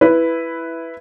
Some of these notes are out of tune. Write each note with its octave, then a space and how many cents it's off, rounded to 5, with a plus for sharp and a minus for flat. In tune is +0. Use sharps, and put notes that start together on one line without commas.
E4 +0 B4 +0